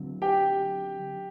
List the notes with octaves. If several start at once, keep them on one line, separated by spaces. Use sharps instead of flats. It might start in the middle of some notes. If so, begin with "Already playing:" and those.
Already playing: D3 F#3 C4
G4 G5